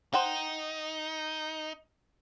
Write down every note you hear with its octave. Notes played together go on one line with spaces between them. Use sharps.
D#4 C5 F#5 G5